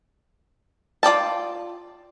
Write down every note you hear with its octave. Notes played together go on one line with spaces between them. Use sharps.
F4 D5 G5 A5